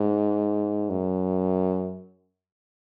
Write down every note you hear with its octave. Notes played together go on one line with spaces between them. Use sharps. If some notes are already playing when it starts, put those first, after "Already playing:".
Already playing: G#2
F#2